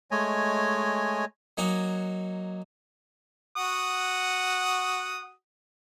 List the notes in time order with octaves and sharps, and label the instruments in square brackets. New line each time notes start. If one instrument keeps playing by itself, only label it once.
[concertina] G#3 A3 C#5 D#5 G#5
[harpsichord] F#3 A#3 D#4 F#5 G#5
[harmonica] F#4 F#5 D#6